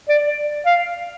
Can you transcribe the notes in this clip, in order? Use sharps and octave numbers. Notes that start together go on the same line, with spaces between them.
D5
F5